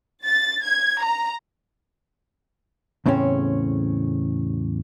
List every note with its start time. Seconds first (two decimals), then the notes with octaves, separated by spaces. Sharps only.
0.24 A6
0.63 G#6
1.02 A#5
3.06 E2 A2 C#3 C4 C#4